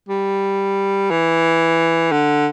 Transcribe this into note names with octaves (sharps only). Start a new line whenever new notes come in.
G3
E3
D3